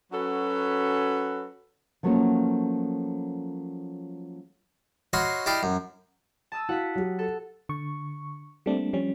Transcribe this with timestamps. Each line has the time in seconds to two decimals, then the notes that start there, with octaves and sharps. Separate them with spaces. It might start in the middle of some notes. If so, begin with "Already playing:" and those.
0.12 F#3 C#4 F#4 A4 B4
2.03 F3 F#3 A3 A#3 C#4
5.13 F#4 C#5 D#5 F5 B5 C6
5.46 E4 G4 D5 D#5 F5
5.63 F#2
6.52 A5 D#6 E6
6.69 E4 F#4 F5 F#5 B6
6.95 F#3 G4
7.19 A4
7.69 D3 C#6
8.66 G3 A3 A#3 C4 D4
8.93 F3 G3 C#4